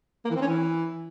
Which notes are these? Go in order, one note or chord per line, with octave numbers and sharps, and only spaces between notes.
A#3
E3
C4
C#4
E3